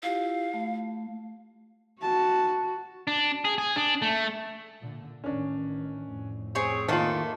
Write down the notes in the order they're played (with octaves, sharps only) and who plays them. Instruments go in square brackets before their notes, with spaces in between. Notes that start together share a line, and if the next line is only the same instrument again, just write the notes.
[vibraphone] E4 F4 G4 [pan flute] F5
[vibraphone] A3
[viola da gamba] F#4 [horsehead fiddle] A5
[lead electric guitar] D4
G#4
G#4
D4
A3
[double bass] A#2 D3
[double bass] A1 D#3 [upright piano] C#4 D4
[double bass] F2 A2
[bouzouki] C4 G#4 C#5 [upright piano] C5
[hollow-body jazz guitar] D#3 F4 [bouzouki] A3 A#3 [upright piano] A5 F#7